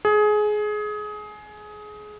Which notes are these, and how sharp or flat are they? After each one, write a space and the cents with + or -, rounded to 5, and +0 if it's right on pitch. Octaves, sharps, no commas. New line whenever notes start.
G#4 +20